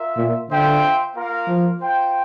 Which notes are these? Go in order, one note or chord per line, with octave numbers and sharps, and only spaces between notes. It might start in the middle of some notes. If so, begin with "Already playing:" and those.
Already playing: F4 A#4 E5
A#2
D3 F4 C5 E5 G5
A#3 F4 A#4 F5
F3
F4 C5 G5